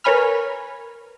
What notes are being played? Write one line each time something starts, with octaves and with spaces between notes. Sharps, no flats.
A#4 B4 C#5 G#5 B5 F6